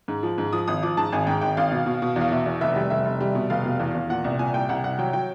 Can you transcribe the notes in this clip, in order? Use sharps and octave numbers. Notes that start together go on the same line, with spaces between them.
G#2
F3
G#2
F3 D#6
G#1 D#6
F3 D6
G#2 A5
G#1 G#5
G#2 G5
G#1 G5
G#1 F5
B2
B2
B2
E2
F5
B2 E5
E2
F1 E5
G3
F1 E5
F1
G3
B2
F1 F5
B2
E2
E2
A#2 F#5
C2
A#2 G#5
C2 G5
C2 F#5
C2 F#5
F#3 G5
F#3 G5